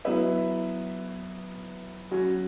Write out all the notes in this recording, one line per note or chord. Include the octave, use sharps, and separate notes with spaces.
F#3 B3 E4 B4 E5
F#3 C#4 F#4